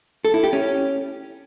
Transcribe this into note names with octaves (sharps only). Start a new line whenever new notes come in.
A4
E4
G4
C#4